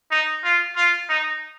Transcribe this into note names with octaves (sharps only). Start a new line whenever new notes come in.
D#4
F4
F4
D#4